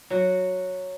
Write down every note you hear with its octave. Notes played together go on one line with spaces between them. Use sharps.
F#3 F#4